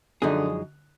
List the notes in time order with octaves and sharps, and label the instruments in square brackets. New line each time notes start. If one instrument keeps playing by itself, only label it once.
[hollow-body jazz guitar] F#2 F3 G#3 D#4 G#4 [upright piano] D3